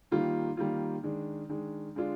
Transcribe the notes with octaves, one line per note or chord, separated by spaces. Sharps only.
D#3 G3 A#3 F4
D#3 G3 A#3 F4
D#3 G#3 D4
D#3 G#3 D4
D3 G#3 D4 F4